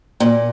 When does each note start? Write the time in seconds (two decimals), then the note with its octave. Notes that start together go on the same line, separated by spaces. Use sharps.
0.20 A#2